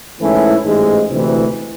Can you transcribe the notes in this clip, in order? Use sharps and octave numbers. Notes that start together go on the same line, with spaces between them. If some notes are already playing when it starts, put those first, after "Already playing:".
G#2 E3 A3 C#4 E4
A1 G#2 E3 G#3
D2 C3 E3